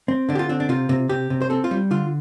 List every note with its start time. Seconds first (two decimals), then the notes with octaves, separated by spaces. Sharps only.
0.08 C4
0.29 D3 D4
0.35 G4
0.39 F4
0.49 C4 D4
0.60 D4
0.69 C3 F4
0.89 C3
1.09 C3 G4
1.30 C3
1.42 C5
1.50 C4 A4
1.64 F4
1.71 G3
1.91 D3 F4